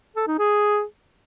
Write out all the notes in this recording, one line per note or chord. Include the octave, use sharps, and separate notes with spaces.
A4
D#4
G#4